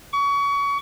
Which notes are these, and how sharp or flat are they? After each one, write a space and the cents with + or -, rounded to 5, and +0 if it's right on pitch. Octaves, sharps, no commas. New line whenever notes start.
C#6 +30